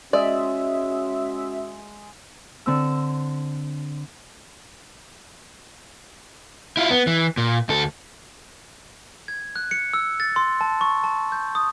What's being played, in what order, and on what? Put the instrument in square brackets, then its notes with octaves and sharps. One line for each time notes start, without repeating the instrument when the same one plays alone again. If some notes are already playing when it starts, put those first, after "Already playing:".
[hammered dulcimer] G#3 [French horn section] C#4 F#4 [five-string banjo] D5 [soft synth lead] E5
[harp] D3 C4 E6
[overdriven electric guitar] E4 F4
B3
E3
A#2
D2 A4
[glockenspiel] G#6
F#6
C#7
E6
A6
C6
A5
C#6
A5
G6
D#6